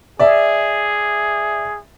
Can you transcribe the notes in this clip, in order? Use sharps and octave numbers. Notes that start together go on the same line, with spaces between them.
G#4 D5 E5